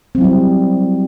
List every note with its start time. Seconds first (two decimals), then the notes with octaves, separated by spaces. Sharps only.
0.15 C4
0.18 F#3
0.21 E4
0.24 G3